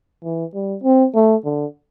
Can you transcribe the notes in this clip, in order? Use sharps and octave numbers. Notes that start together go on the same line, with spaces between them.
E3
G3
C4
A3
D3